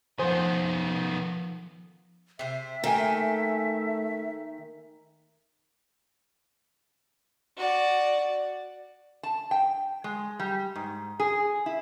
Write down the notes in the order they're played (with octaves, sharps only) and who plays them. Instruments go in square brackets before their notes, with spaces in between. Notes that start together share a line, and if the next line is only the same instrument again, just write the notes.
[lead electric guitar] D#3 B3 [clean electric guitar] F3 A4 G#5 [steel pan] C5
[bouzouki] C3 C5 [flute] E5
[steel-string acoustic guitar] D#3 [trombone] A3 [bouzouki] A#3 G5 G#5
[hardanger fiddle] F#4 D5
[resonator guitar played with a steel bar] A5
G5
G#3
G3
G#2
G#4
E4